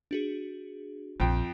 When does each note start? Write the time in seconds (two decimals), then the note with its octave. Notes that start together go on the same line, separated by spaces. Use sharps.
0.11 D4 F#4 G#4
1.20 A#1 F2 G5